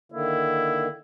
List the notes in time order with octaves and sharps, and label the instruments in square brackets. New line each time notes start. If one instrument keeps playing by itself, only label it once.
[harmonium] D3 D#3 A#3 [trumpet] E4